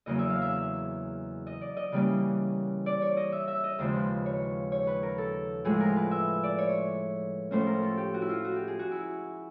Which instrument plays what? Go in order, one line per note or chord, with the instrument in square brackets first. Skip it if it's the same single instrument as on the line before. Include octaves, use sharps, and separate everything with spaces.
[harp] E2 C#3 F#3 A#3 D#5
E5
F5
E5
D#5
D5
D#5
C#3 E3 G3 A#3 C#4
D5
C#5
D#5
E5
E5
D#5
D#2 C#3 F3 G#3 C5
B4
C#5
C#5
B4
A#4
A4
A2 F3 G#3 G#4
A#4
B4
E5
D5
C#5
A2 F3 A3 C#4 C5
A#4
A4
G4
F#4
E4
F4
F#4
G4
G#4
F#4
E4